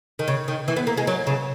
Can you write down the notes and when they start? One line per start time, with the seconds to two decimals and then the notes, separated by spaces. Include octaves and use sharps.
0.19 D#3
0.28 C#3
0.48 D#3
0.68 E3
0.76 B3
0.87 A#3
0.97 G#3
1.07 F#3
1.27 C#3